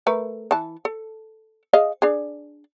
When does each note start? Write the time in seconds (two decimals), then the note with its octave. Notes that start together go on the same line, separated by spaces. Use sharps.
0.07 A3 A#4 B4
0.51 E3 A5
0.85 A4
1.73 G#4 D#5 F5
2.02 D4 G#4